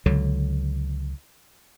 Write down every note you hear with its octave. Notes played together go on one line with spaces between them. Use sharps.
C#2 D3 F#3